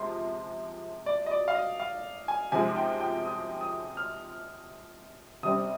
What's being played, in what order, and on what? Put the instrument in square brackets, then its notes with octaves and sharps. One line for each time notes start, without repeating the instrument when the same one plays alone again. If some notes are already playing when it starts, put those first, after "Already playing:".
Already playing: [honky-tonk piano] C3 F3 G#3 [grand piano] C6
[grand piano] D5
D#5
D5
F5
D#5
F5
G#5
[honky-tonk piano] C3 F3 G#3 [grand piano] G#5
[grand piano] G5
G5
D#6
D#6
F6
[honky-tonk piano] C3 G3 C4 [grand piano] D#6